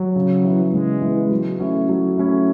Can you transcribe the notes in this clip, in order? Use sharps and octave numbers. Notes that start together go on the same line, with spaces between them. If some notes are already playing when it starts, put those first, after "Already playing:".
Already playing: F#3
C#3
E3 B3
C#3 G#3
E3
B3
F#3
A3 C#4 E4
F#3
A3 C#4 E4